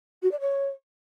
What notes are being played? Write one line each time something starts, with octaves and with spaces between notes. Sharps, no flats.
F#4
D5
C#5